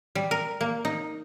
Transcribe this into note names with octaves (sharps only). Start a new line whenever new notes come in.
G3
A#4
A#3
D#4